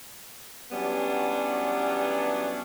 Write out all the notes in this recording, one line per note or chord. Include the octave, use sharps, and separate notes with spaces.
E3 F#3 G3 B3 C#4 D4